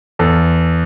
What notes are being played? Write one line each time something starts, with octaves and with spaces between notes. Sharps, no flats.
E2 A4